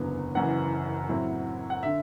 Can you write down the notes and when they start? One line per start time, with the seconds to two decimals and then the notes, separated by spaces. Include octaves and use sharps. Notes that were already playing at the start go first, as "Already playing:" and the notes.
Already playing: F#1 E2 D3 F#3 B3
0.35 F#1 F#2 E3 F#5
1.09 A2 F#3 C4 E4
1.70 F#5
1.83 D3 E5